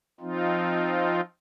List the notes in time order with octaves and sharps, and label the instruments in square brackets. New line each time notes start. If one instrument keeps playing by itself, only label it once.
[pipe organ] F3 C4 D#4 F4